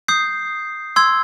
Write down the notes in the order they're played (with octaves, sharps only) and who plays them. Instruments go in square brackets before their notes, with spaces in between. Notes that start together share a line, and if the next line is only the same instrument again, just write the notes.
[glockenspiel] D#6 G6 C7
C6 E6 G#6